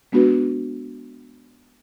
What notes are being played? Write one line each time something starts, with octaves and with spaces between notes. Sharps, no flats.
G#3 B3 D4 F#4 B4